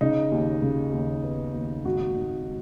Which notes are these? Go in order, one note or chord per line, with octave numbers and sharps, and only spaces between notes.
C#3 D#4
D#2
C#3
D#2
B3
D#2
G#1 F#4
G#1